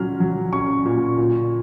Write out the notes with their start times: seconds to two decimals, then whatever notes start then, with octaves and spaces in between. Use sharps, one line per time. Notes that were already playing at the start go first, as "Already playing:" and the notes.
Already playing: A#2 F#3 C#4 F6
0.20 F#3
0.53 C#4 C#6
0.86 A#2
1.18 A#2